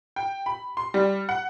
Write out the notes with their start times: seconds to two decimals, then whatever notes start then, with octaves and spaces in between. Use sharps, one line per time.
0.16 G5
0.46 B5
0.77 C6
0.94 G3
1.29 F#5